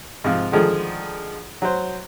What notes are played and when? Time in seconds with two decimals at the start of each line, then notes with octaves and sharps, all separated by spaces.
0.24 G#2 C3 F3 F4
0.52 D3 D#3 F3 G#3 A3 G#4
1.62 F#3 C5